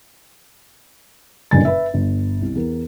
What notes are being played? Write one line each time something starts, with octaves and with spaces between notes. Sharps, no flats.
F#1 G2 A#2 D3 G#5 A6
B4 E5
G1
C2
E2 A#4